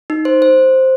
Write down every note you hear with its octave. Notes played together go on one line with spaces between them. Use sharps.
D#4
C5
C5